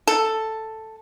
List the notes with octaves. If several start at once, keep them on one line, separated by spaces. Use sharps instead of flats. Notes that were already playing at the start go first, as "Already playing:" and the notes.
A4